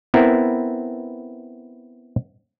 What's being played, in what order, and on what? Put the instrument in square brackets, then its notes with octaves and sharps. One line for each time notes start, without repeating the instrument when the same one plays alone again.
[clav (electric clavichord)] B3 C4 E4 A#4